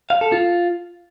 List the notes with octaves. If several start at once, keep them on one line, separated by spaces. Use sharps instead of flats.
F5
A4
F4